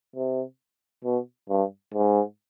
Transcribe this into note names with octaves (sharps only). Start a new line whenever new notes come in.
C3
B2
G2
G#2